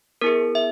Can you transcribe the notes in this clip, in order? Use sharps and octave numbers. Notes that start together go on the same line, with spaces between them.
B3 E4 G#4 A#4
E5